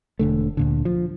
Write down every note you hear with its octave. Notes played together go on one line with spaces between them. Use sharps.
E1 D3 A3
D2 A#2 D3
F3